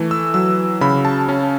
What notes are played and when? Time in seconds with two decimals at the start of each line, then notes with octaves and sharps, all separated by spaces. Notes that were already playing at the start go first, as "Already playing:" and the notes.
Already playing: E3 A3
0.11 E6
0.34 F#3 E6
0.81 C#3 B5
1.05 A5
1.29 C#4 A5